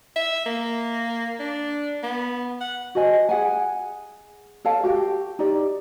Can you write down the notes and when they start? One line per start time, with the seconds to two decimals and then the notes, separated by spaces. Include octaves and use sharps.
0.16 E5
0.46 A#3
1.39 D4
2.03 B3
2.61 F#5
2.95 F#4 C5 D#5 G#5
3.29 G#4 F#5 G#5
4.65 A4 C#5 F5 A5
4.83 F#4 G4 G5
5.39 D#4 G4 D5